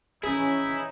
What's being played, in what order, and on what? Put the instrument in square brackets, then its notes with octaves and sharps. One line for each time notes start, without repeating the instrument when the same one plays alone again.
[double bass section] E3 C#4 [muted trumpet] D#4 [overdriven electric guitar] E4 [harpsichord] G#4